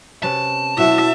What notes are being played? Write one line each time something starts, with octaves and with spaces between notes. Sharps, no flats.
C3 C#4 B4 A5
B2 F#3 E4 F#4 E5